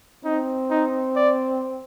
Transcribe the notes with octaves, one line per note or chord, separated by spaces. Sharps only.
C4 D#4
D#4
D5